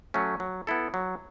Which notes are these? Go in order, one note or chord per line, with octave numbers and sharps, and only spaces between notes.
F#3 A3 C#4
F#3
B3 E4 A4
F#3